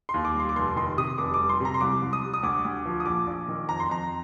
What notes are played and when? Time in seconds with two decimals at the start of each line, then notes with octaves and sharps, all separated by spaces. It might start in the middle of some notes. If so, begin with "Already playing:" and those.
0.09 C6
0.14 D#2
0.25 D6
0.34 G3
0.40 C6
0.49 D6
0.56 F1 C6
0.76 D#3 C6
0.97 C3 D#6
1.18 F1 D6
1.34 D6
1.40 G3
1.49 C6
1.60 C3 A#5
1.74 C6
1.81 C2 D6
2.02 C2
2.13 D#6
2.23 G3
2.34 D#6
2.43 D2 D6
2.65 D2
2.85 F3
3.00 D#6
3.06 A#1 D6
3.27 A#1
3.48 D#3
3.69 F2 A#5
3.80 C6
3.90 F2 A#5